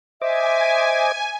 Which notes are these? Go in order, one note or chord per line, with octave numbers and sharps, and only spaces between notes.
C5 D#5 E5 G#5 D6